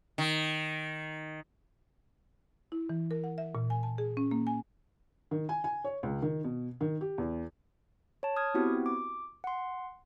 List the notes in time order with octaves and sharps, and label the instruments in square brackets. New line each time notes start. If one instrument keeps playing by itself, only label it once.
[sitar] D#3
[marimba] E4
E3
A#4
F#5
E5
A#2
G#5
A5
G#4
C#4
A#3
G#5
[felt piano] D#3
G#5
G#5
C#5
C#2
D#3
B2
D#3
G4
E2
[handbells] C#5 A5
D#6 F6 G#6
B3 C4 E4 F#4 G4
D6
F#5 C6